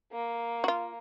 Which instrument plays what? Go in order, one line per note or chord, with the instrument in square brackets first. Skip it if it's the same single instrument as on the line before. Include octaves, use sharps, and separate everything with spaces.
[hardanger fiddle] A#3
[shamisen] F4 F#4